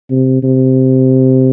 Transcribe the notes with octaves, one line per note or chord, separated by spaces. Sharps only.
C3
C3